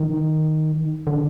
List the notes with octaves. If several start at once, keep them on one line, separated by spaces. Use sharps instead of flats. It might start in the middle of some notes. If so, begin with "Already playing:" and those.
Already playing: D#3
D3